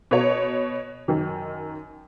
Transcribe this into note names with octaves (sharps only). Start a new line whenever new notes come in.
B2 C#5
F#2 D#3